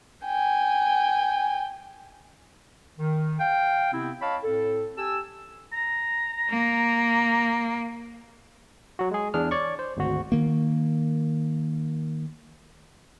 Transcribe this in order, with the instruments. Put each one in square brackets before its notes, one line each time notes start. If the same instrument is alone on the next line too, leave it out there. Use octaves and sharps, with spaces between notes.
[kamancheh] G5 G#5
[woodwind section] D#3
F5 G5
C3 B3 C4 E4
C#5 D#5 F5 A5 B5
A2 C4 A4
G4 G#5 A5 E6
[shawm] A#5
[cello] A#3
[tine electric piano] F#3 F#4
G#3 G#4
E2 D4 G#4 F6
C#5 D5 C#6
C5
G#1 D2 F#4
[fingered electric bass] D#3 A#3